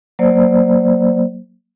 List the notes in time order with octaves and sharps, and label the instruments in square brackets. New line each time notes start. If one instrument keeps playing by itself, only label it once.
[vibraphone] F#3 A#3 C5 D5